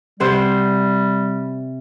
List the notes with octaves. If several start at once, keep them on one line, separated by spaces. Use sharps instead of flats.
C3 G3 C5 F#5